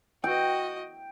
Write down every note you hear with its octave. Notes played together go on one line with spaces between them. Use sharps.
F#4 D#5 G5